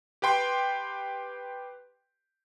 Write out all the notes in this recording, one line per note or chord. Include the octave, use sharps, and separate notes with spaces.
G4 B4 G5 C6